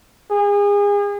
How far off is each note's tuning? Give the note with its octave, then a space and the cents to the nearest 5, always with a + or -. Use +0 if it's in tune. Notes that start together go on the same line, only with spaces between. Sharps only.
G#4 -35